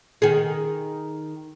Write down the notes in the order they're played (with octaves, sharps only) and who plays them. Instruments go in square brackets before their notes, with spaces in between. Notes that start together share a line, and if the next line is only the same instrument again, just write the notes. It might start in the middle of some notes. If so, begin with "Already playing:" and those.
[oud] D#3 G#4